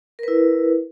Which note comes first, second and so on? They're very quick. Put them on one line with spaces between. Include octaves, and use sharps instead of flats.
A#4 B4 E4